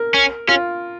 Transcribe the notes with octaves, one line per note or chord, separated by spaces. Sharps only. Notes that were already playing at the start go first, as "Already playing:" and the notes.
Already playing: A#4
C#4
C#4 F4